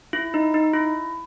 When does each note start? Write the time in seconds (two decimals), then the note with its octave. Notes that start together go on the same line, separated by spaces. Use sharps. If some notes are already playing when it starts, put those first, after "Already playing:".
0.13 E4
0.34 D#4
0.54 D#4
0.74 E4